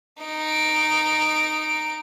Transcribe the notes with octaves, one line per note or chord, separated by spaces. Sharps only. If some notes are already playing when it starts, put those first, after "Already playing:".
D#4 D7